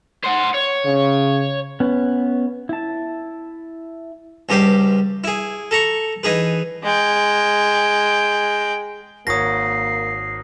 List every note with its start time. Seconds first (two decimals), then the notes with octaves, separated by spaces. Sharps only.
0.24 C5 F#5
0.54 C#5
0.85 C#3
1.80 B3 C#4
2.69 E4 A5
4.49 C#2 G2 G4 C5 D6
5.24 E4 G#4
5.71 A4 A#5 C#6
6.23 E3 D#4 G#4 B4
6.83 G#3 G5
9.27 G#1 A#3 C#5 D#6 A#6 C7